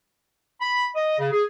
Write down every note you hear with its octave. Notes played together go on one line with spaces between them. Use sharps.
B5
D#5
C#3
G#4